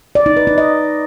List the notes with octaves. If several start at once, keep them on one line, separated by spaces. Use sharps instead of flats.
D5
D#4
B4
D#4
D#5